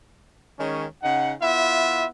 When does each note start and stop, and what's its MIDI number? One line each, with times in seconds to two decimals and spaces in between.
0.58 0.85 51
0.58 0.85 56
0.58 0.85 61
1.03 1.33 49
1.03 1.33 63
1.03 1.33 78
1.41 2.05 59
1.41 2.05 64
1.41 2.05 65
1.41 2.05 76